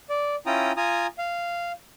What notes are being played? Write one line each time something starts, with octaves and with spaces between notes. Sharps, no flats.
D5
C#4 E4 F4 G5 A#5 D#6
F4 G#5 A#5 D#6
F5